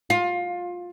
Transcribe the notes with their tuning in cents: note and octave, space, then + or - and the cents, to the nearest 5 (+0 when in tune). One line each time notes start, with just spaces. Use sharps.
F4 +20